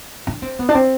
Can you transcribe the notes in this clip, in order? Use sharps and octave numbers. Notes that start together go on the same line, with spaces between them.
D4
C4
B3
D4
C4